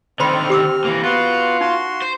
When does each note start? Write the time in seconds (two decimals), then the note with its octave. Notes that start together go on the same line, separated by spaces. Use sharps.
0.20 D3 D#3 C4 C5 B5 C6 F6
0.50 G4 D6 E6
0.85 E3 A#3
1.04 B3 F4 F#4 F#5
1.61 D#4 F#4 C6
2.02 C5